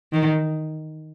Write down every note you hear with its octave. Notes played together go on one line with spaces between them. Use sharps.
D#3